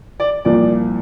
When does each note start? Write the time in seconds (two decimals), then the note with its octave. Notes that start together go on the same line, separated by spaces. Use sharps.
0.20 D5
0.45 C2 A#2 F3 D5